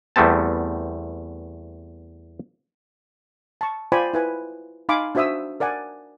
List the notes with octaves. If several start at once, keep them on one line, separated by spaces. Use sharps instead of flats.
E2 G3 A3 B3 C4 A5
A5 C#6
F4 C5 D5 G5 G#5 B5
E4 B4 G#5
D#4 F5 G#5 B5 C6 D6
D4 F#4 C5 E5 D#6 E6
A#4 D5 F#5 G#5